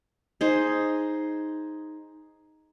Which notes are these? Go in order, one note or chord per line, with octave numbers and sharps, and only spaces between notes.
D#4 G#4 C5